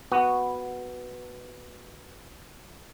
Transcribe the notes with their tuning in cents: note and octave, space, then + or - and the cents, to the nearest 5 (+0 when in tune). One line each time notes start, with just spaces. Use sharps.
B3 +0 F#4 +0